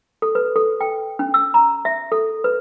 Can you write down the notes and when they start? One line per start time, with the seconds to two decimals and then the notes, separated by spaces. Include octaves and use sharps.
0.22 A4
0.35 B4
0.56 A4
0.81 G5
1.19 C#4
1.34 E6
1.54 A#5
1.85 E5
2.12 A4
2.44 B4